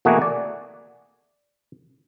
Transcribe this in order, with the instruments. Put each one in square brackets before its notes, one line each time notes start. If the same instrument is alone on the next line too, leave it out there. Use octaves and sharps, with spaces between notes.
[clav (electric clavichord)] B2 E3 A3 A#3 F#4 G#4
D5